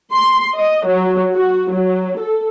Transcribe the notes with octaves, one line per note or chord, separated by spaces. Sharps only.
C6
D#5
F#3
F#4
F#3
A4